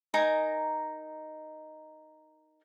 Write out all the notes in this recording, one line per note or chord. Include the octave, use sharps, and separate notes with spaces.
D#4 A#4 G#5 A#5